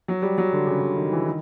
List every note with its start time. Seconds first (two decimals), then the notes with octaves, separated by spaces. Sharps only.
0.08 F#3
0.22 G3
0.38 F#3
0.53 D3
0.67 C#3
0.81 D3
0.96 D#3
1.12 E3
1.26 D#3